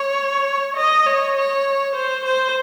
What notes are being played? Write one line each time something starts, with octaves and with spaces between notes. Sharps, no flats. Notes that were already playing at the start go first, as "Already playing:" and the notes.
Already playing: C#5
D#5
C#5
C#5
C5
C5